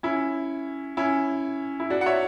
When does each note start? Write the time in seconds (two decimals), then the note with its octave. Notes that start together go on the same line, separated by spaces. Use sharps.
0.03 C#4 E4
0.97 C#4 E4
1.80 E4
1.90 D4 F#4
2.01 F#5
2.06 C#5 E5